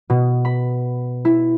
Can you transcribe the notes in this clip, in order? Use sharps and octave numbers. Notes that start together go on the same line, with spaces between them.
B2
B5
E4